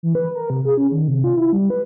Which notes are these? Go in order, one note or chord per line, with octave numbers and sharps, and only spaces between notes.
E3
B4
A#4
C3
G#4
C#4
D#3
C3
F4
E4
G3
B4